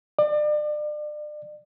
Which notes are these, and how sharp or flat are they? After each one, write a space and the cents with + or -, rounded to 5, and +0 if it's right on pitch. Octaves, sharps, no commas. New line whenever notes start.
D5 +35